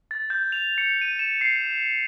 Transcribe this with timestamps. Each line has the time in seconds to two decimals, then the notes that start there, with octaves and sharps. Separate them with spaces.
0.11 A6
0.30 G6
0.52 F7
0.78 C#7
1.01 D#7
1.19 E7
1.41 C7